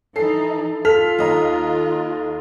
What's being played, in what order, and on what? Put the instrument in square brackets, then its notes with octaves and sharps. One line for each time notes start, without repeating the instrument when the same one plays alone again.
[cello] E3 D#4 [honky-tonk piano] A4 C7
[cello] F4 [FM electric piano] A4 [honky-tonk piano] F6 B6 F7
[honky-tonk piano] D#2 D#5 A#5